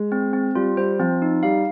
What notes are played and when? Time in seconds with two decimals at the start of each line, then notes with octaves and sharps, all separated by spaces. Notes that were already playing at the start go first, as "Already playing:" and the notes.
Already playing: G#3
0.12 C4
0.33 C4
0.55 G3 F4
0.77 G3 C5
0.99 F3 C4
1.22 D#4
1.43 G3 F5